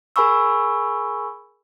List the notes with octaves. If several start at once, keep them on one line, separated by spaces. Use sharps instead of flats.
G#4 A#4 G#5 B5 C#6 E6